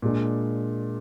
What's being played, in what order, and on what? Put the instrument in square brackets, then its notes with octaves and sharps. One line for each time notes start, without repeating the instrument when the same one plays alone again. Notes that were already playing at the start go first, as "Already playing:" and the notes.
[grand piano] A#2 G#3 D4